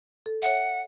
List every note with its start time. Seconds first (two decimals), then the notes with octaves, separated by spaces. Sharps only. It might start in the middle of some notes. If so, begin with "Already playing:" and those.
0.26 A4
0.42 C#5 E5 F#5